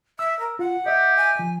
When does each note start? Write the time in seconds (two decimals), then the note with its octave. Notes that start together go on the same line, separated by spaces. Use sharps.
0.19 E5 E6
0.39 A#4
0.59 F4 F#5
0.86 G4 D#5 E5
1.17 G#5
1.39 F3